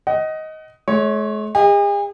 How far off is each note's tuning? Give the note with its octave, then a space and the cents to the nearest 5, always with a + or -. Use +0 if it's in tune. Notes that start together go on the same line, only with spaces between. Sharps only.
D#5 +10 F#5 +35
G#3 +45 C#5 +0
G#4 -45 D#5 +10